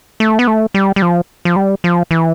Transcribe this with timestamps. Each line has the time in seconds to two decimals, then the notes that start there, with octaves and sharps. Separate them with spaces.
0.20 A3
0.39 B3
0.47 A3
0.74 G3
0.96 G3
1.02 F3
1.45 F3
1.56 G3
1.84 F3
2.11 E3